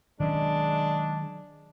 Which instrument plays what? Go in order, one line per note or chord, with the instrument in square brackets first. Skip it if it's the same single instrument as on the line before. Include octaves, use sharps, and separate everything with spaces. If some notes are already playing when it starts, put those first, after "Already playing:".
[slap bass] D#3 F#3 C#4 [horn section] G#3 D4